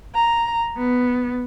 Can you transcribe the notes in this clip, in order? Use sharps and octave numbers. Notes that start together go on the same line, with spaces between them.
A#5
B3